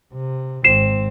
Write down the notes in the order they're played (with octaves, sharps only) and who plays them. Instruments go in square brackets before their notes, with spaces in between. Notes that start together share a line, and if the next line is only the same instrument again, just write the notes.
[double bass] C3
[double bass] G#1 C4 [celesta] C7 E7